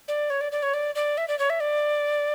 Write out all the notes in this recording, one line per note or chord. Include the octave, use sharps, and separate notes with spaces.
D5
C#5
D5
D5
C#5
D5
D5
E5
D5
C#5
E5
D5